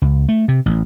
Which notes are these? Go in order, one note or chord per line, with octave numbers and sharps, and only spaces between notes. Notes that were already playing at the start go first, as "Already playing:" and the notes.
C#2
A3
C3
A1